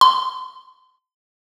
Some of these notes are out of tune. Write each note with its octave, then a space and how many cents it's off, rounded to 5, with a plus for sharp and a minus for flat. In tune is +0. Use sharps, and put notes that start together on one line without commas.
C6 -35